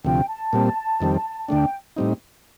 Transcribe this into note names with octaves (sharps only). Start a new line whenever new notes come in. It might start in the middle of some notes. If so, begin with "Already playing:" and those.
D2 C3 F3 G5
A5
A#2 G3 C4
F2 D#3 G3 C4
D2 D3 A3 D4 G5
A2 G3 C4 D#4